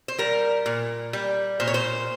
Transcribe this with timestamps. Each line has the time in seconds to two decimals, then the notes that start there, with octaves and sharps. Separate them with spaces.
0.08 C5
0.18 G3 A#4
0.66 A#2
1.13 G3
1.60 A#2 C5
1.67 C#5
1.74 C5